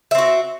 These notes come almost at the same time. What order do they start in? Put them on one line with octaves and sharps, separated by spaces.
E5 C4 F#4